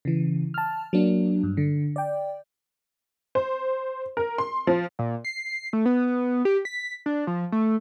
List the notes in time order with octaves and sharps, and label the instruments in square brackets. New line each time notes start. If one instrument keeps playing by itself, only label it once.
[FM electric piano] C#3 E3
A5 F6
F#3 A#3 D4
G2
D3
D5 G5
[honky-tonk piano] C5
A#4
C6
F3
[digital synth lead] A#2
C7
A3
B3
G4
B6
D4
F3
A3